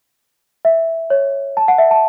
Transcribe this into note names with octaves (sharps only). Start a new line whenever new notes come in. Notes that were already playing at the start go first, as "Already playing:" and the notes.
E5
C#5
A5
F#5
E5
A5